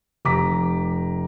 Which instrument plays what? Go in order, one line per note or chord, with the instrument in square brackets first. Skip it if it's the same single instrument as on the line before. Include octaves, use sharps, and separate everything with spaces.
[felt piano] F1 A#5 D6 B6